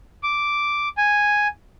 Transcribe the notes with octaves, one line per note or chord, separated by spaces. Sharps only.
D6
G#5